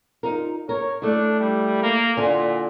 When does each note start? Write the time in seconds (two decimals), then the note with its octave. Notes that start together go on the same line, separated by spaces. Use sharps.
0.23 D#4 F4 A#4
0.69 A#4 C#5
1.02 A3 D4 E4
1.40 G3
1.82 A#3
2.17 A#2 D3 E4 G#5